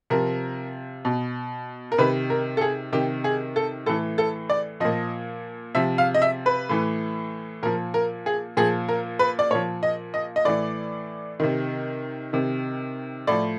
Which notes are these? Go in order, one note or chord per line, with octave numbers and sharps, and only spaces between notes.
C3 F3 A#4
B2
A#4
C3 D#3 B4
A#4
A4
G#4
C3 D#3 G4
G#4
A4
A2 E3 A4
A4
D5
A#2 F3 D#5
C3 F3 E5
F5
D#5
E5
B4
A2 E3
A#2 F3 A#4
A#4
G#4
A#2 F3 G#4
A#4
B4
D5
A#2 F3 C#5
D#5
D#5
D#5
A2 E3 D5
C3 D#3
C3 D#3
A2 F3 D5